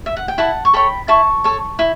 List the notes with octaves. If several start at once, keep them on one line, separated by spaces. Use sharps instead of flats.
E5
F#5
G5
E4 F#5 A5
C#6
A4 C#5 G5 B5
E4 A5 C#6
A4 C#5
E4